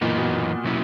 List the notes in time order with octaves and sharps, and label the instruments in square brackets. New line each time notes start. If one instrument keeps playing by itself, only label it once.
[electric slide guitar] F#2 E3 B3 D#4 [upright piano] A#2
[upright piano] B2
[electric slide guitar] B2 F#3 C#4 E4